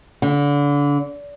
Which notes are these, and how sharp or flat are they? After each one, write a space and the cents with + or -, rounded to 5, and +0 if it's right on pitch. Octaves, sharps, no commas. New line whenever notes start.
D3 -30